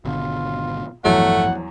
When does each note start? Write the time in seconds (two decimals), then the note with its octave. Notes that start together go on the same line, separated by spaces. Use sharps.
0.05 G#1 B2 D3 F4
1.05 A1 E2 G2 F3 F#3 A3 F#5